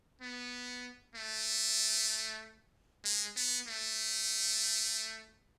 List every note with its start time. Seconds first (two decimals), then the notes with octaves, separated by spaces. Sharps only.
0.21 B3
1.15 A3
3.05 G#3
3.36 B3
3.68 A3